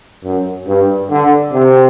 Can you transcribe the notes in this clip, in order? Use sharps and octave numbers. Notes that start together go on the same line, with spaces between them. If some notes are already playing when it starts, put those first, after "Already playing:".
F#2
G2
D3
C3